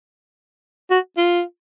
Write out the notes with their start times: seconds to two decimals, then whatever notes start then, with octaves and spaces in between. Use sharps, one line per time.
0.91 F#4
1.18 F4